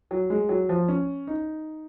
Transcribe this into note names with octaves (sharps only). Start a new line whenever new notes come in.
F#3
G#3
F#3
F3
C#4
D#4